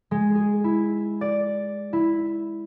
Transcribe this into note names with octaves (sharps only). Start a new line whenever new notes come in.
G#3
G#4
E4
D5
E4